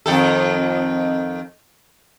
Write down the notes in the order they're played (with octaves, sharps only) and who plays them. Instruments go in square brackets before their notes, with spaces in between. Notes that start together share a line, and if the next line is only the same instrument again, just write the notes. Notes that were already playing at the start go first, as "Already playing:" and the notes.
[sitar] F2 D#3 A4